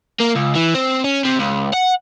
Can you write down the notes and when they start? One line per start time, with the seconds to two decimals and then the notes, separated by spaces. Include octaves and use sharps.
0.20 A#3
0.35 C#2
0.55 E3
0.74 C4
1.04 C#4
1.25 C3
1.39 C#2
1.74 F#5